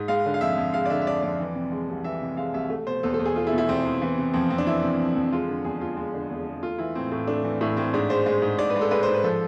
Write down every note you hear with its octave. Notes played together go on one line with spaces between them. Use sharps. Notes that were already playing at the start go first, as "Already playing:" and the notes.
Already playing: G#2
G#3 F5
D3
F5
F2 E5
F2
G#3 F5
D5
D3 E5
E5
F2 D5
F2 D5
E3
C3
G#3
C2
E3 E5
C3
G#3 F5
C2 E5
A3
B2 C5
E2 A4
A4
E2
G#4
A3 F4
E4
B2
E4
E2 C4
E2
E3
C3
F2 C4
F2 C4
D4
E3 E4
C3
F2
F2
G#3 F4
D3
E2 G#4
E2 F4
G#3
D3
E2
E2
A3 F4
E3 E4
A2 C4
A2 C4
A3 D4
E3
A2 E4
A2 C4
G#2 D4
G#3 C5
G#3
G#2
G#2 D5
B4
G#3
A4
G#3 B4
C5
G#2
B4
F3 A4